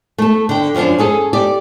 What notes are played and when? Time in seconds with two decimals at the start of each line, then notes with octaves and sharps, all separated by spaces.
0.18 A3 A4
0.49 D3 G5
0.75 F#2 F3 B3 C#4 D4
0.98 C#4 G#4 A4
1.33 G4 D5